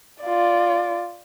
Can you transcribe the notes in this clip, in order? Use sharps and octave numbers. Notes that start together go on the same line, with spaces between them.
F4 D5